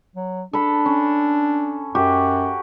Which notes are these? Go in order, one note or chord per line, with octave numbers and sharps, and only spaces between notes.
F#3
D4 A4 B5
C#4
F#2 F#4 G4